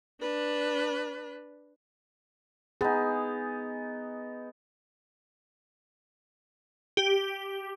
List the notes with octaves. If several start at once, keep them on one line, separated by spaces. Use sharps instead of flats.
D4 B4
B3 D#4 G#4
G4